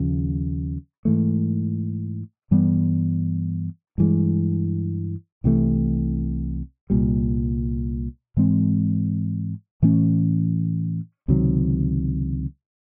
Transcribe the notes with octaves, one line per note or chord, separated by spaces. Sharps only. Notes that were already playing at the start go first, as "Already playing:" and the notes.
Already playing: D#2 C#3 F3
G#2 E3 A3
G2 E3 G3 B3
G2 E3 G#3
C2 C3 E3 A3
C2 A#2 G3
G#2 E3 G#3 C4
A2 E3 A3 C#4
C#2 C3 D#3 F#3